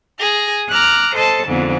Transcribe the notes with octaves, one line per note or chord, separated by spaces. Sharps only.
G#4 A#6
A#5 D6 F6 F#6
A4 C5 D#5 A5
F2 G#2 D3 B3